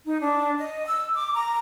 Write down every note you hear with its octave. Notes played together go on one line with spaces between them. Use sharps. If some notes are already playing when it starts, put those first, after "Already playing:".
D#4
D4
D#5
E6
D6
A#5